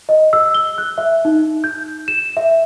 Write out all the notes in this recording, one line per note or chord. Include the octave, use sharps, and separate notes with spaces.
D#5
E6
G7
F#6
E5
D#4
G6
E7
E5